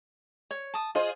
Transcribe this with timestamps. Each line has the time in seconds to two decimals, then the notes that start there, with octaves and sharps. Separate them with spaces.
0.51 C#5
0.74 A5 D#6
0.95 F4 G#4 C5 D#5